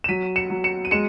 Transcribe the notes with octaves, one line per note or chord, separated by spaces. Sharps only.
E7
F#3 B6 D#7
C#7 E7
F#3
C#7 E7
D#7
G#3 C#7 E7